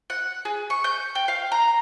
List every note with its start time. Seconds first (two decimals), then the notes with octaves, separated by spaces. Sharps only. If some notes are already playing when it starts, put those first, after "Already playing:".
0.10 F#5
0.45 G#4
0.70 C#6
0.84 G6
1.15 G5
1.28 F5
1.52 A#5